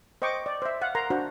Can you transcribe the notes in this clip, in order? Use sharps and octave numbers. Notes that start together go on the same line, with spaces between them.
C5 D#5 G5 C#6 D6
D5
C5 E5
F5 F#5
A#4 A#5 C6
D4 F#4 C5